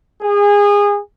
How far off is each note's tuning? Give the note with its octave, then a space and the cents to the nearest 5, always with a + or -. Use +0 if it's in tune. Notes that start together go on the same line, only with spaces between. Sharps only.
G#4 -25